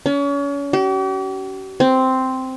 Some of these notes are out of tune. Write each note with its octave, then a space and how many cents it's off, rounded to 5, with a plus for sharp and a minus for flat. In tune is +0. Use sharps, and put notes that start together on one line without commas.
C#4 +35
G4 -45
C4 -5